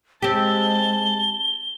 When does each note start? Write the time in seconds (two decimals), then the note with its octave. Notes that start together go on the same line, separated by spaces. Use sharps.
0.22 G#3 C4 G4 A5 G7